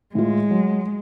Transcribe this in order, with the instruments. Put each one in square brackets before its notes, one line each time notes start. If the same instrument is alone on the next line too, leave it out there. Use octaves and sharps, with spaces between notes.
[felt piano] A2 F4 [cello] G#3
[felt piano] F#3